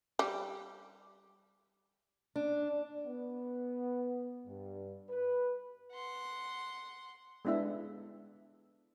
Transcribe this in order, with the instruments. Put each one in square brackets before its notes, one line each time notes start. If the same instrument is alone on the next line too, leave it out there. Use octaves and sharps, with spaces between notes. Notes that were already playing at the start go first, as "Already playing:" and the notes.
[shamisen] G3
[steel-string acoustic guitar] D4
[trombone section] B3
G2
B4
[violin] F#5 C6
[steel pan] G#3 B3 D4 E4 E5